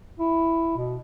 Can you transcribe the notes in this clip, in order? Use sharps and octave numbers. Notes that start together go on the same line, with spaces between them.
E4
B2